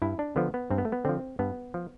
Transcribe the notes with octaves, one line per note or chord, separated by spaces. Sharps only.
G2 E4
D4
D3 F3 B3
B3
G2 C4
B3
A3
B3
D3 F3 C4
G2 B3
F3